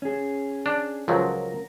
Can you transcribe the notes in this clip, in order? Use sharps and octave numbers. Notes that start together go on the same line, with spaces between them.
C#4 G#4
D4
C#2 F3 F#3 A#4